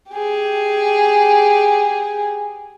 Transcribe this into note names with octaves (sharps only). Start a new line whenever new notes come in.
G4 G#4